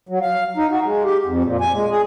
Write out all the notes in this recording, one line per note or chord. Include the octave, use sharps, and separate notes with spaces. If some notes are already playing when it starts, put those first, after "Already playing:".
F#3
F5
D#4
F#4
G#3
G4
F2
A#2
G#5
G#3
G#4